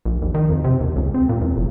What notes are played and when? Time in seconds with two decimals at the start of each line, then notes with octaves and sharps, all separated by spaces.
0.05 A#1
0.22 D#2
0.35 D#3
0.50 F2
0.64 C3
0.81 D#2
0.96 C#2
1.14 C4
1.29 A#2
1.41 E2
1.57 F1